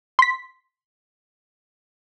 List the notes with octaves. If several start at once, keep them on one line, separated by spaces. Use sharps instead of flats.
C6 B6